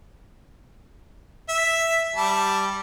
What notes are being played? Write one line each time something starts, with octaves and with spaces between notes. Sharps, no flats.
E5
G3 A5